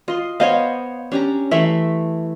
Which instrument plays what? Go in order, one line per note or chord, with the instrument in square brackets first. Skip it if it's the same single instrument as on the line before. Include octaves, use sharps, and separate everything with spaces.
[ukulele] F4 [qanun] D#5 C6
[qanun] B3 C5 C#5 [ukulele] D#5 F5
[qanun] C#4 G4 A#5 [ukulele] D4
[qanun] E3 A3 C6 [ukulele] E5